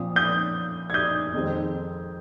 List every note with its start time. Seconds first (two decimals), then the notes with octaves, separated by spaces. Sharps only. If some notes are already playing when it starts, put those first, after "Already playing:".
Already playing: A#2 F3 C4 D#6
0.16 D#6 G6
0.90 G#6
0.94 D#6 G6
1.34 F2 D#3 G#3 C4